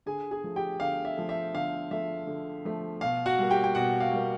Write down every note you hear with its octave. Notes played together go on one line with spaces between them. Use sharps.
D3 G#4 G#5
G#4 G#5
F3 A3
G4 G5
D3 F5
E5
F3 A3
E5
D3 F5
F3 A3 E5
D3
F3 A3
B2 F5
F#4 F#5
G3 A#3
G4 G5
G5
B2 F#4 F#5
F5
G3 A#3